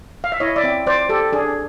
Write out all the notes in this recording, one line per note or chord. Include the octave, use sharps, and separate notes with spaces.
F5
E5
E4 C#5 D#5
D5 E5
C4
C4 C5 D5
G4 A4
D4 G#4